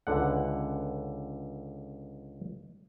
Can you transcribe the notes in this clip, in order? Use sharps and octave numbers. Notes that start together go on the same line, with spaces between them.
C#2 D3 F#5